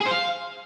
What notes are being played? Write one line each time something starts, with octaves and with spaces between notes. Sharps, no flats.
G#4
C5
F5